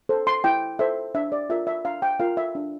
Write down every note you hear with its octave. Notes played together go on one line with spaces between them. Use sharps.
A4 C5
C6
E4 G5
A4 C5 E5
D4 E5
D5
F4 A#4 E5
E5
D4 F5
G5
F4 A#4 F5
E5
D4